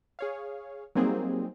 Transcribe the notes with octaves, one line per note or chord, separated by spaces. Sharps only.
G#4 C#5 F5
F#3 G3 A#3 C4 D#4 G#4